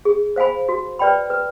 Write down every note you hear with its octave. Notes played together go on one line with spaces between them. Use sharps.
G#4
C5 F5 G#5 B5
F#4
B4 D5 G5 B5
B4